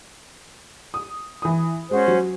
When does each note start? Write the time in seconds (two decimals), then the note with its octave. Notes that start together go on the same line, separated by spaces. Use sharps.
0.94 D#6
1.42 E3 D#6
1.91 G#3 C#4 F#4 C5
2.08 F#3